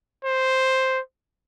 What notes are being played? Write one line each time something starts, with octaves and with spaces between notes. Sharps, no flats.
C5